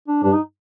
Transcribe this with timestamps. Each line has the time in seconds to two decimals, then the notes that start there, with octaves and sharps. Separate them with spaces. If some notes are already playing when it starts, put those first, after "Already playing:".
0.08 D4
0.23 G2 D4
0.33 D#4